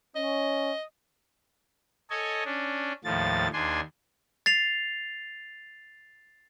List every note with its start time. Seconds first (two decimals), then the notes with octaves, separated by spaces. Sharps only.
0.15 C#4 D#5
2.10 A4 C#5 D#5 G#5
2.45 C#4 D4
3.04 D#2 A2 F3 A6
3.53 D#2 D4 G#5 C6
4.46 A6 C7 F7